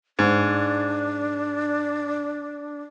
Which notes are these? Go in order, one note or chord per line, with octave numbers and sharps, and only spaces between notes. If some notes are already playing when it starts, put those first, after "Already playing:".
G#2 D4